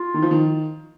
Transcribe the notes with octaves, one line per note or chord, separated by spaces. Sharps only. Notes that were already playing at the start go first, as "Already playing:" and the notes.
Already playing: F4
D#3
F3
D#3